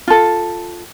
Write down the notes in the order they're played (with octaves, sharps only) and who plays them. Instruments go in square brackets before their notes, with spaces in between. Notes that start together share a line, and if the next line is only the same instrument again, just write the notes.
[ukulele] F4 A4